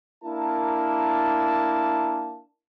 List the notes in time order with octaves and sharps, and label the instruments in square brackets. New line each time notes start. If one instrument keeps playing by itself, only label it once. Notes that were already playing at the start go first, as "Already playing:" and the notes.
[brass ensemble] A#3 D4 E4 A#4 A5